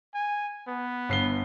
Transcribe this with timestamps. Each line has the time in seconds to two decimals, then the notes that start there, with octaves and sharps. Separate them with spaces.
0.14 G#5
0.67 B3
1.09 G1 C7 G7